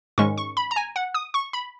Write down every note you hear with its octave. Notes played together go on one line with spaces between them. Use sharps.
G#2 D#3 G#3 C#4 C#6
C#6
B5
A#5
G#5
F#5
D#6
C#6
B5